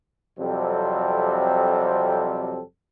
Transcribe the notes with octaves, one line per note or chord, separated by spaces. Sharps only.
F2 C3 F#3 G3 C4 A4